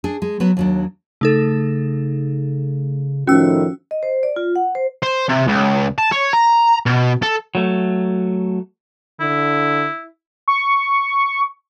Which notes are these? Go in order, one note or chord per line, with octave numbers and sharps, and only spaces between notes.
D4 G#4
G#3
F#3 B3 B4
D#2 F#3 D4
C#3 A3 D#4 A4
A2 D#3 F3 C#4 F#4 E6
D#5
C5
D5
F4
F#5
C5
C5
C3
C#2
A5
C#5
A#5
B2
A4
F#3 A3
D3 E4
C#6